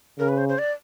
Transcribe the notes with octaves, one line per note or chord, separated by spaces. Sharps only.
C#3 A#4
B4
C5
C5
D5